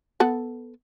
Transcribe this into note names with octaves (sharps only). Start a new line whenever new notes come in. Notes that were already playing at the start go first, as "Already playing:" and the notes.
B3 A4 F#5